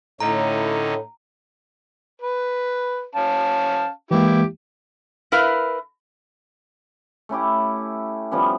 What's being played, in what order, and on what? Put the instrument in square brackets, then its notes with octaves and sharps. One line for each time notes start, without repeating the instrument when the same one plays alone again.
[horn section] A2 [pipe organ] D3 C#4 D#4 [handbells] A#5
[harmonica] B4
C#4 F5 A5
[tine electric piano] E3 G#3 A#3 [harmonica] E4 G4
[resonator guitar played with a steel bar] E4 A#4 B4 F5
[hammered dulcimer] A3 C#4 E4 G4
F3 G3 B3 C#4